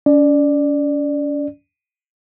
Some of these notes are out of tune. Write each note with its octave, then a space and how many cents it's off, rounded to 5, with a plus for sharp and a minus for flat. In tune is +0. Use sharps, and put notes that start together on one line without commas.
C#4 +45 D5 +15